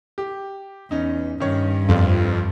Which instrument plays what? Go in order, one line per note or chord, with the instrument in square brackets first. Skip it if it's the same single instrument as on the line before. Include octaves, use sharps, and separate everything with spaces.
[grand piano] G4
[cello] E2 [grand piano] C#4 D#4
[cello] G2 [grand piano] D#3 C#4 C#5
[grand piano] A#1 F4 [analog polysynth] F2